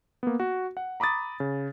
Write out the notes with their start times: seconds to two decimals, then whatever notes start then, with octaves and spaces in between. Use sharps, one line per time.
0.23 A#3 B3
0.40 F#4
0.77 F#5
1.00 A#5 B5 D6 D#6 A6
1.40 C#3